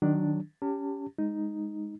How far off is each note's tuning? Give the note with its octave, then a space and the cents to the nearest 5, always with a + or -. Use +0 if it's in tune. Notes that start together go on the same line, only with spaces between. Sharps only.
D#3 -15 F#3 +0 D4 +0
C#4 +20 G4 +0 A5 +35
G#3 +0 D#4 +0